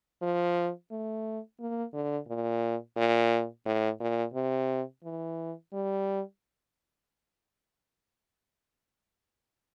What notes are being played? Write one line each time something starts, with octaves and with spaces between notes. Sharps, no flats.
F3
A3
A#3
D3
A#2
A#2
A2
A#2
C3
E3
G3